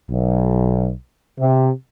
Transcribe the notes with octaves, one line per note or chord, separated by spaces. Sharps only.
B1
C3